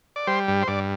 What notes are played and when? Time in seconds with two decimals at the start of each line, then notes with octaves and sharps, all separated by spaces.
0.16 D5
0.27 G3 C5
0.48 G2
0.62 C5
0.68 G2 D5